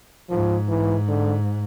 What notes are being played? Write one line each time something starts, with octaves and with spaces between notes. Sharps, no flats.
G#2 F3
E3
D3